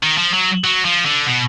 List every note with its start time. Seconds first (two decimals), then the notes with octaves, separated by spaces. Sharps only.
0.03 D#3
0.17 F3
0.33 F#3
0.64 F#3
0.85 F3
1.06 D3
1.26 B2